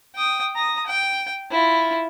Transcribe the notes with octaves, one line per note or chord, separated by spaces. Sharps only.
G5 D#6
A#5 D#6
G5
E4 F4